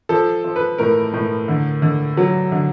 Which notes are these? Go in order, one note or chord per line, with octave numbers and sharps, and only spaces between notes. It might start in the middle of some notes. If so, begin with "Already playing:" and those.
F3 A4
F3
B4
A2 A#4
A2
D3
D3
F#3
D3